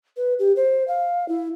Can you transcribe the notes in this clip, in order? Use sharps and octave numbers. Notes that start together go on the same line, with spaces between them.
B4
G4
C5
F5
E4